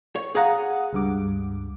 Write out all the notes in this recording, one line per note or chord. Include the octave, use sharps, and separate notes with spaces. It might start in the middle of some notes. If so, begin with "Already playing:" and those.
C#5
G#4 F5 F#5 A#5 D#6
C#2 G2 D6